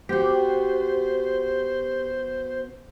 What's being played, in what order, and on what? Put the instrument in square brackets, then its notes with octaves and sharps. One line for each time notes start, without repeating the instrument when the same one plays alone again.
[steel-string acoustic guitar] B3 F#4 [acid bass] G4 [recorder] C5